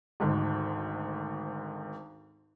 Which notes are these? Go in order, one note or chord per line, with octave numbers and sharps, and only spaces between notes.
G#1 D2 G#2